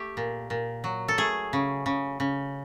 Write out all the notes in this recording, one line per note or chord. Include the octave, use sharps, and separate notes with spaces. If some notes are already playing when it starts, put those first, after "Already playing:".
Already playing: A3 G4
A#2
A#2
F#3
A4
A3 G#4
C#3
C#3
C#3